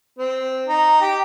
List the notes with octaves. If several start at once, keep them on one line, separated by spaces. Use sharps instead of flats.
C4
D#4
G4